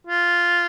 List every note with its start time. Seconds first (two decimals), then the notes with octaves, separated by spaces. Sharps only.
0.07 F4